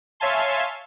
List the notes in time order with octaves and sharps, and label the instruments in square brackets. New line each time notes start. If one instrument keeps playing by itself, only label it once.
[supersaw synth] C#5 E5 F5 G#5 A5 C6